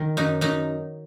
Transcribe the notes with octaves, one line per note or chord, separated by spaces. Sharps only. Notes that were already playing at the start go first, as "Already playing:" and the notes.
Already playing: D#3
F#2 D#4
F#2 D#4